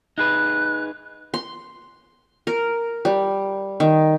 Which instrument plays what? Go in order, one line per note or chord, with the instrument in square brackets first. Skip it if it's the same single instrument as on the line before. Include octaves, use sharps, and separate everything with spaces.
[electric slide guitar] D#4 G#4 B4 [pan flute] F#6
[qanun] C6
A#4
G3
D#3